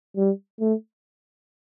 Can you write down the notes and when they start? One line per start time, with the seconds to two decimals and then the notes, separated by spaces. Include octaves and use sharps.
0.17 G3
0.61 A3